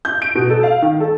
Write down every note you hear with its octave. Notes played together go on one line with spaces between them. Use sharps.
G6
D7
B2
A4
F5
D#3
A4